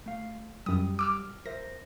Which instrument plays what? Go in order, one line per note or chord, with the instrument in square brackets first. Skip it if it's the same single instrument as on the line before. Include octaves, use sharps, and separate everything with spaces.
[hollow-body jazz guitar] A3 F5
[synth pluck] F#2 D#6 [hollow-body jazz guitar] G3
[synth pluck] D6 E6 F6
[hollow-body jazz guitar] A#4 C5 E5 [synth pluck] A#6